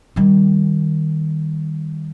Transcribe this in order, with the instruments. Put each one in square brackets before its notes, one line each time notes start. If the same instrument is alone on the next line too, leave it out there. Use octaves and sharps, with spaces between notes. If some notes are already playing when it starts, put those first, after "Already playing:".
[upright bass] D#3 G3